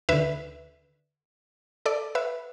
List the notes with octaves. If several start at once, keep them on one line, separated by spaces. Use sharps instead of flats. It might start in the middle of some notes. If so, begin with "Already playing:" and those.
D2 D3 B4 E5
A4 D5
B4 E5